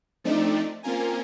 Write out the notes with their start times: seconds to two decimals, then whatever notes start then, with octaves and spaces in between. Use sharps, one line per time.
0.24 F3 A3 C4 D4 D#4 D5
0.83 A#3 C4 C#4 F4 A#4 G#5